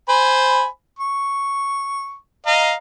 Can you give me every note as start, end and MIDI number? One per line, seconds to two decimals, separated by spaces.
0.09 0.65 72
0.09 0.65 80
0.09 0.65 83
0.99 2.15 85
2.46 2.75 75
2.46 2.75 77
2.46 2.75 82